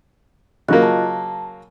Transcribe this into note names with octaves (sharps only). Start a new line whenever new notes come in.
C#3 F#3 A#3 F4 D#5 F#6
A5 A#5